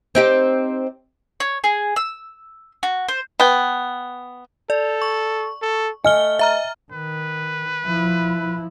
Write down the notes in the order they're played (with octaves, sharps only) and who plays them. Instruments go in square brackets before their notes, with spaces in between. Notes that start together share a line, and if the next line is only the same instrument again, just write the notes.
[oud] C4 D#4 G4
[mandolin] C#5
G#4
E6
F#4
C5
[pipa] B3 G5
[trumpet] A4 [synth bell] D5
[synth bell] C#6
[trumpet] A4
[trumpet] A3 [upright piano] D#5 [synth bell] G#5 F6 G7
[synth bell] E5 A#5 F6
[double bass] D#3 [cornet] B4
[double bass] F3 E4